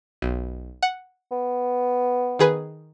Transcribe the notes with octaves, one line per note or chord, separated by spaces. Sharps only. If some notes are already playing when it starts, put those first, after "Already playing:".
B1
F#5
B3
D#3 G#4 B4